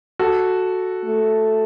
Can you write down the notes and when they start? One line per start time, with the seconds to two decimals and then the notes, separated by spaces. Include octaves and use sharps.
0.19 F#4 A4
1.05 A3